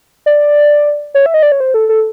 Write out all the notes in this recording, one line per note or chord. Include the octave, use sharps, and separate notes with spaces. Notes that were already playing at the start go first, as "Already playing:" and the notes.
D5
C#5
E5
D#5
D5
C#5
C5
A4
A4